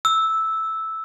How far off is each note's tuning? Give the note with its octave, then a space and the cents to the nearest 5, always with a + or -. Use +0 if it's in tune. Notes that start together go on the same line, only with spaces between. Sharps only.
E6 -10